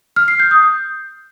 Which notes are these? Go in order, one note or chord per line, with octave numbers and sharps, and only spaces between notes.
F6
C7
G6
D#6
G6